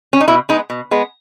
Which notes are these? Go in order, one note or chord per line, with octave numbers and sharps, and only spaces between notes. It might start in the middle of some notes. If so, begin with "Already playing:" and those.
C#4
D#4
B2 E4
G#3 B3 D#4
B2
G#3 B3